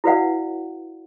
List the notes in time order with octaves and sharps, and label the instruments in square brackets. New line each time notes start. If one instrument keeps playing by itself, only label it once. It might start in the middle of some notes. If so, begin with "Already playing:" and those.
[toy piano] E4 F#4 B4 D5 F5 F#5